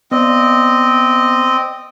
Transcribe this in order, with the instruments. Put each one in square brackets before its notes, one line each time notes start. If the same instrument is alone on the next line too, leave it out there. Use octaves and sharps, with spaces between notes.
[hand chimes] B3 D5 [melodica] C4 D#5